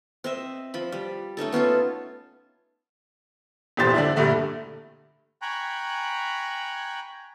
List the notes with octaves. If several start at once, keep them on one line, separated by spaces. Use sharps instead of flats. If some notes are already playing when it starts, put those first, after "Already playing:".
C4 D#5 E5
F3 B5
G3
A3 C#4 D#4 A4
B3 C#4 F4 A4
D#1 G#1 E2 G4 C5 A6
D3 D4 E4
A#1 G2 A#2 D3 A3
G5 G#5 A#5 B5 C#6 F#6